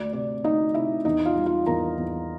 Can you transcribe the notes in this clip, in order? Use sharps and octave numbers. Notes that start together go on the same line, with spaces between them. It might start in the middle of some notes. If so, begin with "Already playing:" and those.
Already playing: D2 D5
C3 D5
D2 D#4 D#5
C3 E4 E5
E2 D#4 D#5
F4 F5
G3
F4 F5
E2 A#4 A#5
E2